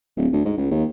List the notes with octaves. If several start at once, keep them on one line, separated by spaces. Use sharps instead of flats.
D1
D2
G#2
C#2
D#2